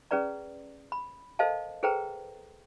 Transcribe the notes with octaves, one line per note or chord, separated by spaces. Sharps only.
C#4 G#4 B4 D5 A#5
B5
A4 A#4 C5 D#5 F5 A5
G#4 A4 B4 C5 G5 A#5